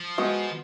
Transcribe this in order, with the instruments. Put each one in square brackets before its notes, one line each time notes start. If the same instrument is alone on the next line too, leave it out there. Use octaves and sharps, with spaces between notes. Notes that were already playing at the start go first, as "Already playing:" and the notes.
Already playing: [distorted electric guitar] F3
[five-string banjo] G#3 B3 F#4